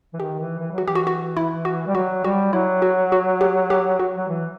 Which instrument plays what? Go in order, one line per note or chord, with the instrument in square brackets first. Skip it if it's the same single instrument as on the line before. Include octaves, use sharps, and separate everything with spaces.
[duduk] E3
[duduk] D#3 [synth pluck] G4
[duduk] E3
E3
F#3
[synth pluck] F#4
[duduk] E3 [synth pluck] G4
[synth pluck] F#4
F#4
E4
F#4
[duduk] G3
[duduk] F#3 [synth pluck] F#4
[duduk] G3 [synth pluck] F#4
[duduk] F#3 [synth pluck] E4
[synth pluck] F#4
F#4
G4
G4
F#4
[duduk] F#3
E3